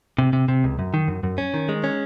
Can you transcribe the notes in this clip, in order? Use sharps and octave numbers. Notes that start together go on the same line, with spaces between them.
C3
C3
C3
C#2
F#2
D#3
F#2
F#2
C#4
D#3
G#3
C#4